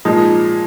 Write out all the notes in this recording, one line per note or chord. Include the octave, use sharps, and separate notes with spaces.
A#2 F3 G#3 D#4